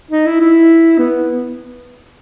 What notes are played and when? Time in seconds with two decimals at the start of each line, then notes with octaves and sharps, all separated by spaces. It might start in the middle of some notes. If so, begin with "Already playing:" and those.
0.11 D#4
0.26 E4
0.41 E4
0.98 B3